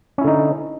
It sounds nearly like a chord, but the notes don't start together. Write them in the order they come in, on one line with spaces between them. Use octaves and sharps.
C#4 E4 D3 D#4